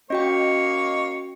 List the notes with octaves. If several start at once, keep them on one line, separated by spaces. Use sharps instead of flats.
A#3 C#4 F#4 C#5 D#5 G5